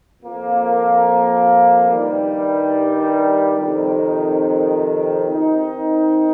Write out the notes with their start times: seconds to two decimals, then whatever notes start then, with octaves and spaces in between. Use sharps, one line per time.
0.23 F2 F3 A#3
1.90 G2 D#3 G3
3.58 F2 C3 D#3
5.25 D#3 C4 D#4